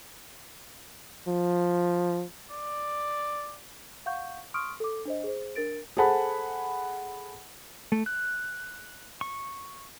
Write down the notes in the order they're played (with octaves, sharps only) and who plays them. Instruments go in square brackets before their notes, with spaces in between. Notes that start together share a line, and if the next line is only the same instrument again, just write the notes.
[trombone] F3
[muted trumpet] D5
[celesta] F5 F#5 C#6 G6
C6 C#6 D#6 F6 D7
A4 D6
D4 C5 D#5
G#4 C5
D4 A#4 A6 D7
[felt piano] G#4 A4 C5 F#5 A5 B5
[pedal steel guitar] A3
F#6
C#6